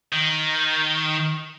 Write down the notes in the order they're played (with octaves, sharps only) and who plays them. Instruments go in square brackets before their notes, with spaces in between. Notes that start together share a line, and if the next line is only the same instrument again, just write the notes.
[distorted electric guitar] D#3